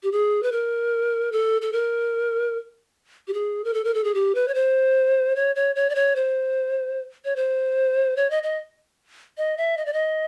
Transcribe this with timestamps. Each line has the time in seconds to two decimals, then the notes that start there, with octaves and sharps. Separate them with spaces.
0.03 G4
0.12 G#4
0.43 B4
0.52 A#4
1.32 A4
1.62 A4
1.73 A#4
3.28 G4
3.34 G#4
3.64 A#4
3.74 A4
3.85 A#4
3.94 A4
4.04 G#4
4.14 G4
4.35 B4
4.48 C#5
4.54 C5
5.36 C#5
5.56 C#5
5.76 C#5
5.90 D5
5.95 C#5
6.16 C5
7.25 C#5
7.36 C5
8.17 C#5
8.30 D#5
8.43 D#5
9.38 D#5
9.57 E5
9.77 D#5
9.86 D5
9.93 D#5